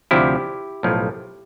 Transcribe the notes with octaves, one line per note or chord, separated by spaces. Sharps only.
D2 C3 F3 E4 G4
B1 A2 F3